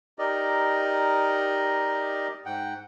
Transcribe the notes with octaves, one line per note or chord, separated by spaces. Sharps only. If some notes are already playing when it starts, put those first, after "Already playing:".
D#4 G4 A#4 D5 D#5
G#2 F#5 G5